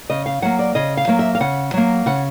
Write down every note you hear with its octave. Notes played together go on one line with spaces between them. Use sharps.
C#3 D#5
F5
F#3 A#3 F#5
D5
C#3 D#5
F5
F#3 A#3
E5
F5
C#3 F#5
F#3 A#3
C#3 F#5